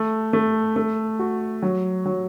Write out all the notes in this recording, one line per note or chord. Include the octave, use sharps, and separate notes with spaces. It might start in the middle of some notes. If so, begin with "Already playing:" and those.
Already playing: A3
A3
A3
F#4
F#3
F#3